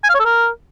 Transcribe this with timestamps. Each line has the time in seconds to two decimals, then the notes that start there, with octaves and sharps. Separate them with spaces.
0.04 G#5
0.09 F5
0.14 C#5
0.20 A4
0.25 A#4